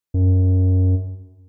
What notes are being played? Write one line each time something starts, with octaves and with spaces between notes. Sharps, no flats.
F#2